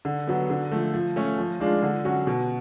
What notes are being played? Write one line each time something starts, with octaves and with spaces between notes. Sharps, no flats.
D3
F#3 B3
D3
F3 A3
F3
A3 C#4
F3
G#3 D4 F4
D3
F#3 C#4 F#4
B2